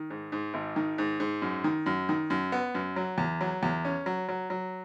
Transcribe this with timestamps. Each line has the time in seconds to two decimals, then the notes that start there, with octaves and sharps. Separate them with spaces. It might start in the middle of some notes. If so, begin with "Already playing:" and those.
Already playing: D#3
0.10 G#2
0.32 G#2
0.54 G#1
0.76 D#3
0.98 G#2
1.20 G#2
1.42 F#2
1.64 D#3
1.86 F#2
2.09 D#3
2.30 F#2
2.52 B3
2.75 F#2
2.96 F#3
3.18 E2
3.41 F#3
3.63 E2
3.85 C#4
4.06 F#3
4.29 F#3
4.50 F#3